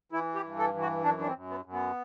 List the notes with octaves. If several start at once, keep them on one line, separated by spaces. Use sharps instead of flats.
E3 E4
G4
G2
A4
E3
F#4
F#2 D4
D4
C4
F#2
B3
F#2
B3